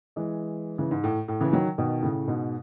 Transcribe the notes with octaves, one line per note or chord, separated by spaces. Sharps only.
E3 G#3
C#3 E3
G#2
A2
A2
C#3 E3
D#3 F#3
B2 D#3
A2 C#3
G#2 B2